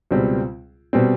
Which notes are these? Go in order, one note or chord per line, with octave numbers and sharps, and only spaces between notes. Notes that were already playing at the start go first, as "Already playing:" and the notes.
C#2 B2 G3 C4
B2 G3 C4